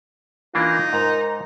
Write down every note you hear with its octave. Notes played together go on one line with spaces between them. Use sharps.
E3 A#3 D4 D#4 F4
G#2 A#4 A#5